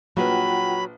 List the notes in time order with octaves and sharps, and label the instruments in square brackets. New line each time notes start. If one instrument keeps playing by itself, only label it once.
[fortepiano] A#1 B4 [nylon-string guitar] F#3 [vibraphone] F4 F#5 G5 [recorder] B5